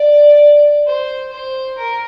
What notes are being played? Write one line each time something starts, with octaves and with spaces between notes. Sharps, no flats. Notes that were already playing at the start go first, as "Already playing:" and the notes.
Already playing: D5
C5
C5
A#4